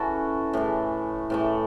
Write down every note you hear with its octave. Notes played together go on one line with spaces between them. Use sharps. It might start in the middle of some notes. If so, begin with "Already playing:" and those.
Already playing: E3 C#4 F#4 A4
A2 E3 A3
A2 E3 A3